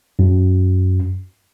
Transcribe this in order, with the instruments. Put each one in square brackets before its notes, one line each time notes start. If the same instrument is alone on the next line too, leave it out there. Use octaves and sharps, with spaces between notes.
[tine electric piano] F#2